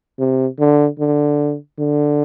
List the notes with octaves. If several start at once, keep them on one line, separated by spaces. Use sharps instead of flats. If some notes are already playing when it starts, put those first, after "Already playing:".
C3
D3
D3
D3